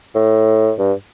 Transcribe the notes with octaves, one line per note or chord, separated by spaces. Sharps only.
A2
G2